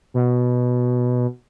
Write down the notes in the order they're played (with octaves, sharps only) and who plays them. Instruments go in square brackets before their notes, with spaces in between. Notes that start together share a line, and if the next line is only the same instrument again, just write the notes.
[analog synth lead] B2